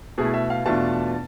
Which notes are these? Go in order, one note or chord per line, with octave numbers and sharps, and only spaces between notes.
B2 A3 E4 G#4
E5
F5
E2 B2 A3 D4 F4 A5